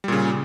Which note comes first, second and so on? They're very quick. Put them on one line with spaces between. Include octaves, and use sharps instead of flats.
G3 A#2 C#3